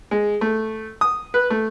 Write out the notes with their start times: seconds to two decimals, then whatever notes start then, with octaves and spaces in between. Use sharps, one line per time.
0.11 G#3
0.41 A3
1.01 D#6
1.34 B4
1.50 A3